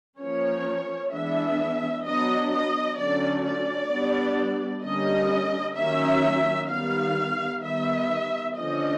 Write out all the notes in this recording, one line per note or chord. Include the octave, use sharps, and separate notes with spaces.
F3 A#3 C#4 C#5
E3 G#3 B3 D4 E5
F#3 B3 D4 D#5
D#5
D3 F#3 A3 C#4 D5
D5
G3 B3 D4
D3 G3 A#3 C#4 D#5
D#3 F#3 A#3 C#4 E5
D#3 G3 B3 F5
D#3 G3 B3 E5
D3 F3 A3 C#4 D#5